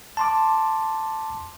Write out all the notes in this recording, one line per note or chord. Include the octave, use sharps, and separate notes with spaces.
A5 C6 D6